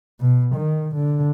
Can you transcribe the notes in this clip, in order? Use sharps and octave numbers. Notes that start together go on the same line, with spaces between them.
B2
D#3
D3